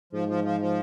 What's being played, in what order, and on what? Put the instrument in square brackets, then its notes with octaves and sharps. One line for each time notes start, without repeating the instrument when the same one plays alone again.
[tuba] G#2 [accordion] F3
[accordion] F3
F3
F3